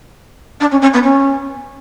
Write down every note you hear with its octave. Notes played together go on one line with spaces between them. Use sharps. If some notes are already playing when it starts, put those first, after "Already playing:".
D4
C#4
C#4
B3
C#4